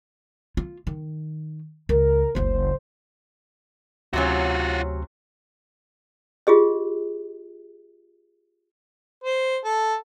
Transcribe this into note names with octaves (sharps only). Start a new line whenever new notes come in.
F4
D#3
C#2 A#4
F#1 C#2 C5
D2 C3 F#3 C#4 F4 F#4
F4 G4 G#4 D#5
C5
A4